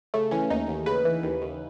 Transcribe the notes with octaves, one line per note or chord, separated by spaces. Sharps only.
C#3 A3
E3 C#4
D#2 D#4
D#2
C#3 B4
E3
D#2
D#2